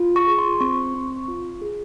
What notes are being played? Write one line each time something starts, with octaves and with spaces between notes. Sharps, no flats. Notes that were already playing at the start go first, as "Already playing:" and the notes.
Already playing: F4
C#6
G#4
C6
C4 C#6
C4
F4
G#4